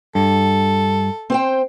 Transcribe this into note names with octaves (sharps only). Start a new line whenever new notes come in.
G2 A4
C4 C5 G5